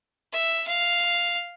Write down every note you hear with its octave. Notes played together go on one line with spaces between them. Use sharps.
E5
F5